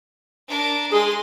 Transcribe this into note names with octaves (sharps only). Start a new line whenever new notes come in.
D4 A#4
G#3 G#4 C6